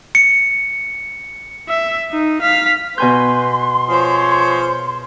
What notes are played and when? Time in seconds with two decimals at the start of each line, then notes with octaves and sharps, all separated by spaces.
0.15 C#7
1.69 E5
2.12 D#4
2.42 F5 B6
2.98 B2 B4 G#5 C6 G6
3.89 F3 G#4 C5 C#5